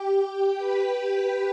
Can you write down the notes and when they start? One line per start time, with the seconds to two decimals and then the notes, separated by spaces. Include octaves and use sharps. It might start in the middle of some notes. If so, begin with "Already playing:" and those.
Already playing: G4 G5
0.58 B4 B5